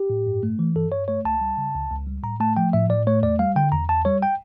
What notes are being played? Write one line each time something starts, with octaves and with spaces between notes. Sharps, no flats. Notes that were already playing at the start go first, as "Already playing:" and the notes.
Already playing: G4
A2
G2
A3
E3
G2 A4
G2 C#5
A3 C#5
C#2 A5
G3
C#3
C#2
C#2
G3
A2 A#5
A3 A5
F3 G5
A2 E5
A2 D5
A3 C#5
E2 D5
G3 F5
D3 G5
E2 A#5
E2 A5
G3 C#5
G5